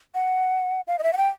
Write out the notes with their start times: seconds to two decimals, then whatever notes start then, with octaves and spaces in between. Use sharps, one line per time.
0.14 F#5
0.88 F5
0.99 D#5
1.03 E5
1.13 F#5
1.17 G5